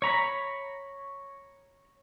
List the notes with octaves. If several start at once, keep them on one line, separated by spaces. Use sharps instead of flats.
C#5 A#5 B5